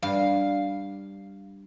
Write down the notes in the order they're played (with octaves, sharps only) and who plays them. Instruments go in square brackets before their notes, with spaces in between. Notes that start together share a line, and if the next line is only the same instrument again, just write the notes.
[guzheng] G2 [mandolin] F5